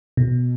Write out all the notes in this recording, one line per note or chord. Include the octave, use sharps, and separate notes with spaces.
B2